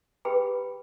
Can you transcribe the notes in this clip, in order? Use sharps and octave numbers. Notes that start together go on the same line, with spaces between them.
G4 G#4 B4 G5 B5